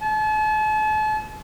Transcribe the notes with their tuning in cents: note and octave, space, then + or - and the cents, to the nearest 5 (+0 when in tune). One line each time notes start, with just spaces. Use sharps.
A5 -40